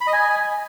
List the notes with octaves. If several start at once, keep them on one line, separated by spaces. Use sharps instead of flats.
B5
D#5
G#5